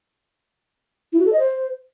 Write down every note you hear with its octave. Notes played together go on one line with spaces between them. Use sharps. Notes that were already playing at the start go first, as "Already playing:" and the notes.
E4
F#4
A4
D#5
C5